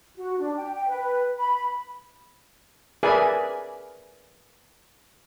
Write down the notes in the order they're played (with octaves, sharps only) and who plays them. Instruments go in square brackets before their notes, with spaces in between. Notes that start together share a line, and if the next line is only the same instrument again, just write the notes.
[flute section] F#4
D4
G5
G5
B4
B5
[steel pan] G#4 A#4 B4 D5 E5 G#5